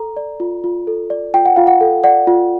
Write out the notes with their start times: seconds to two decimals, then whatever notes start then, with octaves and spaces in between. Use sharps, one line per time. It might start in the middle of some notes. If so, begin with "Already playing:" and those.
Already playing: A4 A#5
0.17 D5
0.40 F4
0.64 F4
0.87 A4
1.10 D5
1.34 F4 G5
1.46 F#5
1.56 F4 F5
1.67 F#5
1.81 A4
2.04 D5 F#5
2.27 F4